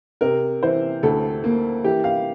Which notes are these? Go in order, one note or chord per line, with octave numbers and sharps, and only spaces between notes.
C3 A#4
E3 C5
D2 A4
A#3
E3 G4
F5